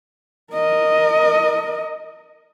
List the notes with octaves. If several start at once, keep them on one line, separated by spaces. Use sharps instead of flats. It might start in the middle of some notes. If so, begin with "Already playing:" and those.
A#4 D#5